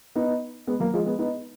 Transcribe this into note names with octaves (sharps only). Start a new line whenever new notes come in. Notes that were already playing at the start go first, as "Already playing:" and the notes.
B3 D#4
G#3 B3
F#3 A#3
F3 G#3
G#3 B3
B3 D#4